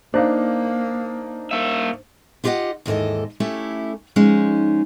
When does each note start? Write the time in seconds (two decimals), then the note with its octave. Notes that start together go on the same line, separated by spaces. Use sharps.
0.14 A#3 D4 D#4 C5 F5
1.51 A#3 E5
2.44 E4 F4 G4 C#5 D#5 F#5
2.86 D#2 G#2 E3 A4 D#5
3.40 A3 C#4 E4 G4 A4
4.16 F3 G#3 C#4 D#4